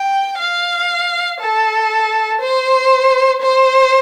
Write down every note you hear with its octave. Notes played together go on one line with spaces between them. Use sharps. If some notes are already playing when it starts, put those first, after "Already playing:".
Already playing: G5
F5
A4
C5
C5